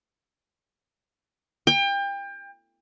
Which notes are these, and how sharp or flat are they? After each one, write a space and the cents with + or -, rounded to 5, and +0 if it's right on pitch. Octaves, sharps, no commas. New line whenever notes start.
G5 +30